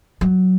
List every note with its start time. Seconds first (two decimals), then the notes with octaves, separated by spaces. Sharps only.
0.21 F#3